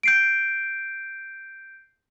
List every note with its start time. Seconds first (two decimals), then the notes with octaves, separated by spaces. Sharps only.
0.03 G6 C7 D7